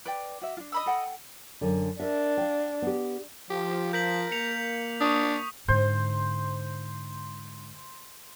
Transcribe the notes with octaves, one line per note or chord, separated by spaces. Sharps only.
B4 D5 G5 D6
F#4 E5
D4 F4
D#5 B5 E6
A4 F#5 G5
F#2 D3
D4 A#4 E5
F5 G5
B3 G4
F3 G4
A#4 G6 B6 F#7
A#3 C#7 F7
D4 C#6 D#6
G#2 D3 C5